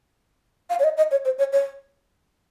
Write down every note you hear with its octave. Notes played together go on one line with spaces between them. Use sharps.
F5
C#5
D#5
D#5
C#5
C5
C#5
C#5